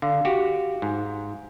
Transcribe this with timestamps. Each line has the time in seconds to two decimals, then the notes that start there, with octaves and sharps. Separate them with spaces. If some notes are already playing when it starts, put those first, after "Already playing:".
0.02 D3 F5
0.25 F#4 G4
0.82 G#2